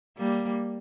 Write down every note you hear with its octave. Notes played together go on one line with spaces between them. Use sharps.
G3 A#3